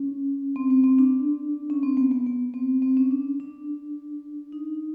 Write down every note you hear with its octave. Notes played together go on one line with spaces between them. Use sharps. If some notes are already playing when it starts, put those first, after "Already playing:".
Already playing: C#4
C4
C4
C4
D4
C#4
C4
B3
B3
B3
C4
C4
C#4
D4
D4
D#4